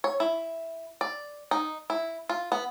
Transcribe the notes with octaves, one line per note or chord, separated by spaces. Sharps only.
C#5
E4
D5
D#4
E4
F4
B3